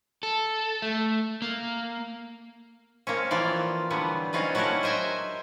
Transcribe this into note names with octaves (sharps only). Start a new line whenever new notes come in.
A4
A3
A#3
A#3 C4 C#4
E3 F3 F4 D5
D3 E3 F#3 G3 B3
C4 C#4 D#4 F4 B4 D#5
F#3 C#4 D4 E4 F#4 A#4
C5 D#5 E5 G5 G#5